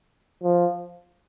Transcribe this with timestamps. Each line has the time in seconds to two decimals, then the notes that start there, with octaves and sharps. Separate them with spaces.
0.43 F3